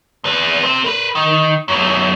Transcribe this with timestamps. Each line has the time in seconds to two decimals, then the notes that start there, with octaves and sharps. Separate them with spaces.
0.24 E2 B4
0.63 C3 C4
0.84 A#4 B4
1.15 D#3
1.68 F#2 B3